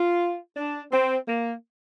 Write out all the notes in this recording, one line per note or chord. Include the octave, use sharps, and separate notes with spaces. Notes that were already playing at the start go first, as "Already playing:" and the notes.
Already playing: F4
D4
C4
A#3